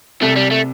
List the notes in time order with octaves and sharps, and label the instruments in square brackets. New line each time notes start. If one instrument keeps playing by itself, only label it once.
[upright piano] C2 C3 [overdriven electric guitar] A3
[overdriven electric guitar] G3
A3